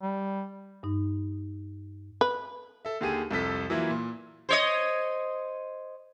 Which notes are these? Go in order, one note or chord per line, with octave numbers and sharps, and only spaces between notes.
G3
G2 D#4
B4
A4 E5
D#2 D3 G4 G#4 D#7
C2 F2 A4 B6
E3 F#3 A#3 E4 F4
A#2
C5 C#5 D#5